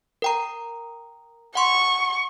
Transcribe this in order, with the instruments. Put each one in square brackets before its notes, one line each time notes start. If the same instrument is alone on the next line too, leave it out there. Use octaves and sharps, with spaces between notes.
[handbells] A#4 G5 A#5
[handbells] F#5 C6 [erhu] C#6